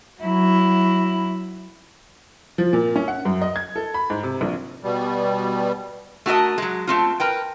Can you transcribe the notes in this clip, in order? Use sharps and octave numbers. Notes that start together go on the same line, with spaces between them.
F#3 E4
F3
A#2
C#4
F#5
F#2
D#5
G#6
A4
B5
G#2
C3
A#1
B2 G3
A3 F#4 A#4 D#5
F#3 G#3
A3 C4 F4
A#4 B4 G5